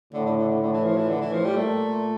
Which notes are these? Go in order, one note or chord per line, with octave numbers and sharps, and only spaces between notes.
A2 D3
D3
D3
D3
A2 D3
E3
F3
E3
A2 D3
E3
F3
G3
A#2 A3